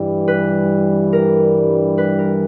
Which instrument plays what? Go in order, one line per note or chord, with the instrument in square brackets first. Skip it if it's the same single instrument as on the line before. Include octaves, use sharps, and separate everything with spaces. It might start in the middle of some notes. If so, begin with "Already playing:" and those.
Already playing: [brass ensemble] G2 E3 G3
[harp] B4
A#4
B4
A#4